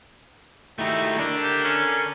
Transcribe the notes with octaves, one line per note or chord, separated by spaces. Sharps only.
D#3 A3 D#4 E4 F#4 G4
D4 A4 A#4 D5
G4
C#4